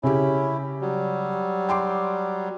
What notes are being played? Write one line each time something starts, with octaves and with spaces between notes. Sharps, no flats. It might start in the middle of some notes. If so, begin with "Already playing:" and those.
C#3 C#4 E4 G4
F#3 G3
G5 C6 D6